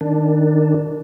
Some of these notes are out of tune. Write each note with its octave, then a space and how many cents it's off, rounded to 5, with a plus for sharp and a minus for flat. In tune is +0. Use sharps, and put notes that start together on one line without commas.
D#3 -15 D4 +0